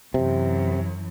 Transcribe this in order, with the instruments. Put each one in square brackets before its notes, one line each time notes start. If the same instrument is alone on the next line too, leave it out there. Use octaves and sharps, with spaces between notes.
[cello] F#2 E3 [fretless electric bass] C3